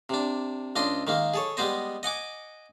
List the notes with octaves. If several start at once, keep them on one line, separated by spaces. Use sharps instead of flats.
C3 D4
C#2 D4 D#5 C6
D#3 G#3 A#3
G#4 A4 C#5
G3 G#3 B3 C5 D#5
D#5 F#5 G#5 D6